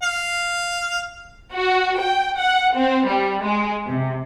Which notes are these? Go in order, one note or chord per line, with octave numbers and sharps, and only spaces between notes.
F5
F#4
G5
F#5
C4
G3
G#3
C3